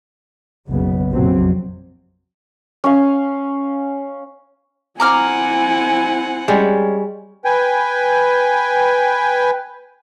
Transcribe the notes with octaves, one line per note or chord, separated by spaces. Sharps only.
F#1 B1 C#3 B3
A#1 F2 C3 F#3 C4
C#4 F5
C4 E4 F#5 G#5 A#5 D6 F6
G3 G#3 C#4
B4 G5 G#5